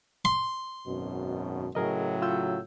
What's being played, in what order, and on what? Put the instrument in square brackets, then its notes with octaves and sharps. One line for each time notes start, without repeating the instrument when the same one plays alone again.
[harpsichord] C6
[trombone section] G#1 F#2 B2
[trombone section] A2 C#3 F#3 [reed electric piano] G#4 A#4 D#5
[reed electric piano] F4 E6 G6